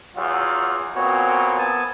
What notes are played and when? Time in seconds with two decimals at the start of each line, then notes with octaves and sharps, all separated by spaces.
0.17 E2 F#3 F4
0.95 A#2 B3 C4 F#4 C#5
1.58 B3 G#5 A5